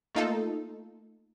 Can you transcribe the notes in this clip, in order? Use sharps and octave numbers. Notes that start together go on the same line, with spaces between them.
A3 A#3 D#4 F4 A4